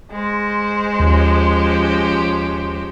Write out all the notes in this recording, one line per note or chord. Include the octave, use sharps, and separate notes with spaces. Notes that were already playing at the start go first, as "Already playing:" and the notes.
G#3 C5
D#2 F3 C#4 G4